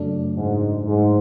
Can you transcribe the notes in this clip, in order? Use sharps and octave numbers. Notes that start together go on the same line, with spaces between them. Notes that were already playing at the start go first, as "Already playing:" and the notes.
Already playing: F#2 C#3 F#3 A3 D4
G#2
G#2